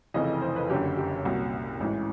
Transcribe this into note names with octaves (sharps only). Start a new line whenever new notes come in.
F1 F2 C#3 E3 D#5
C5
B4
F#1 F#2 D3 G4
G4
C2 A#2 F#4
A1 G#2 E3